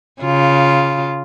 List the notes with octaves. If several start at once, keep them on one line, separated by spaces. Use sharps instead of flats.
C#3 F4